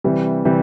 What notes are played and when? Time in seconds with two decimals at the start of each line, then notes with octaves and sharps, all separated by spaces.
0.04 C3 E3 G3
0.45 C3 E3 G3